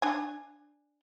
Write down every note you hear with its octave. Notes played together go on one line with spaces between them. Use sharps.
D4 G#5